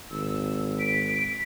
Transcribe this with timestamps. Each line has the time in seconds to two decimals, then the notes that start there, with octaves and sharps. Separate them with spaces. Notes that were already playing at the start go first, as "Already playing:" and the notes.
0.11 G#1 E6
0.80 B6 D7